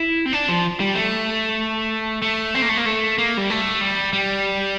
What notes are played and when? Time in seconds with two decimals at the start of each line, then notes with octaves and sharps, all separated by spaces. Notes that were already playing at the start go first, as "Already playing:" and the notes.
Already playing: E4
0.26 C4
0.33 D4
0.49 F3
0.80 G3
0.95 A3
2.22 A3
2.55 C4
2.62 A#3
2.69 A3
2.77 A#3
2.86 A3
3.18 A#3
3.37 G3
3.50 A3
3.81 G3
4.13 G3